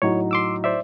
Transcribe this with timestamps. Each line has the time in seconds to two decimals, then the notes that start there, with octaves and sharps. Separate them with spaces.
0.02 A2 F#3 D#4 C#5
0.31 C6 D6 E6
0.64 C5 D5 E5